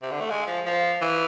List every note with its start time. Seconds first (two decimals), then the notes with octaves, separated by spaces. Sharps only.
0.02 C3
0.11 D3
0.21 A3
0.30 G#3
0.47 F3
0.66 F3
1.02 E3